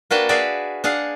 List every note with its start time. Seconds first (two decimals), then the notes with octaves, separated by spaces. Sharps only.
0.11 A#3 D4 F#4 B4 G5 A5
0.29 F#4 G#4 B4 D5 E5 F5
0.84 D4 G#4 F5 F#5